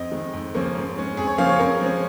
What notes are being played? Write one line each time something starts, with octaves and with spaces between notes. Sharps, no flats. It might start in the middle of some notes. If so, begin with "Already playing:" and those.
Already playing: F2 D#5
D#3 G#3
F2
C#3 F3 A#3 C#4
G#2
G#3 C#4
F2 G#4
C#5
C#3 F3 A#3 C#4 F5
C#5
F2 A#4
F3 G#3 C#4